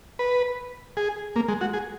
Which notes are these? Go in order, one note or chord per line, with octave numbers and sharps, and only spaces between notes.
B4
G#4
A#3
G#3
F#4
G#4